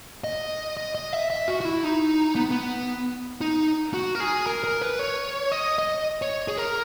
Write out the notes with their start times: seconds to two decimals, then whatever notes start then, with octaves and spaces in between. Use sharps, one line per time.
0.24 D#5
0.77 D#5
0.95 D#5
1.13 E5
1.30 E5
1.48 F#4
1.61 F#4
1.65 E4
1.83 D#4
2.35 B3
2.51 B3
3.41 D#4
3.94 F#4
4.15 A#4
4.20 G#4
4.47 A#4
4.64 A#4
4.82 B4
4.99 C#5
5.52 D#5
5.79 D#5
6.22 C#5
6.48 G#4
6.58 A#4